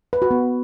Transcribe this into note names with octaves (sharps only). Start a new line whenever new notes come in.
B4
F#4
B3